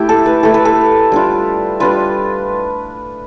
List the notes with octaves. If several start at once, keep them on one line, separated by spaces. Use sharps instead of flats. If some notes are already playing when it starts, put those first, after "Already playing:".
Already playing: A3 E4 G4
A4
B4
A3 E4 A4
B4
A4
G3 D4 F4
G3 D4 F4 B4